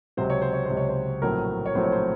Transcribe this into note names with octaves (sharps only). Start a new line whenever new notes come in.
C#2 C3 F#3 C5
C#5
C5
C#5
C#2 C3 F#3 C5
C#5
C5
A#1 A2 F#3 A3 C4 A#4
C#5
A#1 A2 F#3 A3 C4 C5
C#5
C5